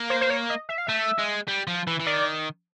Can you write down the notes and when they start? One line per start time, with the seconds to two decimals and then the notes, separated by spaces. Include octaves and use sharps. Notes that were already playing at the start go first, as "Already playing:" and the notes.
Already playing: A#3
0.10 C5
0.21 C5
0.30 C#5
0.50 D#5
0.69 E5
0.78 F5
0.87 A3 E5
1.18 G#3
1.48 G3
1.67 F3
1.87 E3
2.00 E3
2.07 D#3 D5